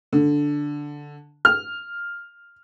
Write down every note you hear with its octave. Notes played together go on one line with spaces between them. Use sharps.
D3
F6